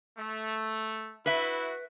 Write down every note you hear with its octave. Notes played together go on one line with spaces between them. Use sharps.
A3
E4 F#4 B4 E5